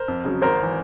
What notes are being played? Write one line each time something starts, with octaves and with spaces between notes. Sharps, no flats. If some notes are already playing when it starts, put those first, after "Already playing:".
Already playing: A#4 C5
F2
C#3 F#3
G#1 A#4 C5
E3